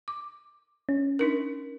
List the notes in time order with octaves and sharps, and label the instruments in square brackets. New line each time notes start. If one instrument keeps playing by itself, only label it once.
[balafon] D6
[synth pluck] C#4
[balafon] D4 D#4 A#4